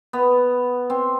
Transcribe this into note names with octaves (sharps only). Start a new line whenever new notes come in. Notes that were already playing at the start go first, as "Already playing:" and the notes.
B3
C4